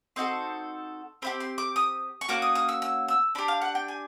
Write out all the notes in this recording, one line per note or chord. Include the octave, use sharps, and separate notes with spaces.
C4 D#4 F#4 A4 C6
C4 E4 G4 B5
C6
D6
D#6
C#6
A#3 C#4 F#4 D6
D#6
D#6
E6
E6
E6
D4 G4 B5
F5
F#5
G5
G#5